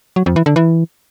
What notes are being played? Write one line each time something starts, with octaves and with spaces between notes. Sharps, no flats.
F#3
F2
E3
D3
E3